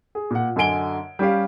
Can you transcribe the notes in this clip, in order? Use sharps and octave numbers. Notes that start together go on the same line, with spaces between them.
G#4
A#2 F#5
F#2 D3 D#5 G#5 D7 G7
G3 C#4 G4 F5